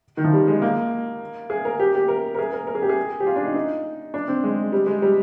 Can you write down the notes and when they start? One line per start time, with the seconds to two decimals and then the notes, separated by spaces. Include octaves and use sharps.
0.17 D#3
0.24 F3
0.33 G3
0.48 G#3
0.62 A#3
1.50 G#4
1.65 A#4
1.80 G4
1.95 G4
2.08 A#4
2.34 A#4
2.39 G#4
2.53 A#4
2.67 A#4
2.75 G#4
2.82 G4
2.89 G#4
3.20 G4
3.27 F4
3.36 D4
3.45 D#4
3.56 D#4
4.14 D4
4.28 C4
4.44 G#3
4.72 G3
4.86 G#3
5.02 G3